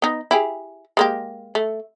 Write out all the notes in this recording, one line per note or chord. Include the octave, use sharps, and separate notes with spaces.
B3 D#4
E4 G4 G#4
G#3 A#3 G4
A3